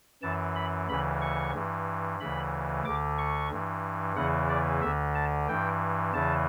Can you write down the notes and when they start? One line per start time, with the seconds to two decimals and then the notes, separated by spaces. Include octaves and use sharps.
0.23 F#2 E3 A5
0.56 B5
0.88 D2 C#3 E3 B5
1.21 C#6
1.54 G2 E3
2.20 D2 C#3 E3 B5
2.85 D2 D3 D6
3.18 C#6
3.51 G2 E3
4.16 E2 C#3 E3 F#5
4.49 D5
4.82 D2 D3 E5
5.15 A5
5.48 G2 E3 G5
6.13 E2 C#3 E3 A5